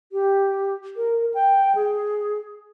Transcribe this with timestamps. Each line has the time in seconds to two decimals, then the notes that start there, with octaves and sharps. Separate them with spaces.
0.12 G4
0.96 A#4
1.34 G5
1.75 G#4